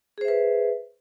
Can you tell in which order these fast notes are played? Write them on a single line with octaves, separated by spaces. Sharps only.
G#4 C5 E5 B4